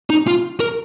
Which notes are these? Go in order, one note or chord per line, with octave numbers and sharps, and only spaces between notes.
D#4
F4
A#4